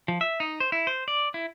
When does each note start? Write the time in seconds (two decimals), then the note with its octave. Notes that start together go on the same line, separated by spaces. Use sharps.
0.08 F3
0.21 E5
0.40 D#4
0.60 C5
0.72 E4
0.87 C5
1.08 D5
1.34 E4